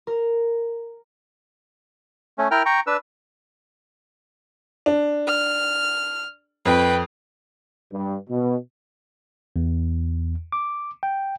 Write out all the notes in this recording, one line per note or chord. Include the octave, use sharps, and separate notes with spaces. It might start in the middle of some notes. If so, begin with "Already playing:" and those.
A#4
A3 C#4
E4 A#4 G5 F6
G5 A#5 C#6
D4 B4 E6
D4
F6
F2 B4 G5
G2
B2
E2
D6
G5